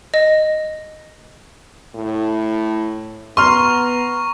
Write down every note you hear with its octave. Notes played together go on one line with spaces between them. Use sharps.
D#5
A2
B3 A#5 C6 C#6 F6